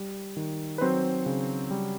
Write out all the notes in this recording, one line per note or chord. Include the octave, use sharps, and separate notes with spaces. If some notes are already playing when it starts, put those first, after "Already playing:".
Already playing: G3
D#3
B4
F#3 C4 C5
C#3
G3